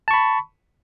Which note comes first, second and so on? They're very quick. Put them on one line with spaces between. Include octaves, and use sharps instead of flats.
A5 C#6 B5